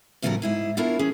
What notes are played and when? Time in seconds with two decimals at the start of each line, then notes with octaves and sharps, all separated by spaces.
0.22 A2 C#3 F3 G3 F#4 A#4
0.42 G#2 E4 G#4
0.77 B3 D4 E4 F4 A#4 C#5
0.99 E3 C#4 G#4